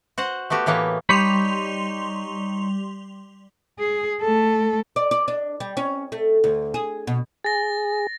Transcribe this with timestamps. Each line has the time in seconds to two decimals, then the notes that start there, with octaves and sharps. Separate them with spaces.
0.18 F#4 C5 F#5
0.50 A3 B3 F#4 G4
0.66 A2 E3 A#3 B3 C#5
1.09 G3 D#4 C#5 B5 C6 F7
3.80 G#4
4.21 A3 A4
4.96 D5
5.11 D5
5.28 D4
5.60 G3
5.77 C#4
6.12 A3
6.44 D2
6.74 G#4
7.07 B2
7.44 G#4 A6 A#6